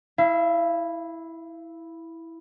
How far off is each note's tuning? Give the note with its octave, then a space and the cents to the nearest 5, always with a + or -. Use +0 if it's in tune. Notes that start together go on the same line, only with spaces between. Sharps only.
E4 -5 F5 -40